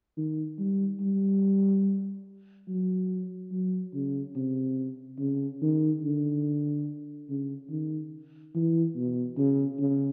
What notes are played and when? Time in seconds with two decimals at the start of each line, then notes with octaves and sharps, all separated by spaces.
0.17 D#3
0.59 G3
1.00 G3
2.68 F#3
3.52 F#3
3.94 C#3
4.36 C3
5.19 C#3
5.62 D#3
6.04 D3
7.29 C#3
7.70 D#3
8.55 E3
8.96 B2
9.38 C#3
9.80 C#3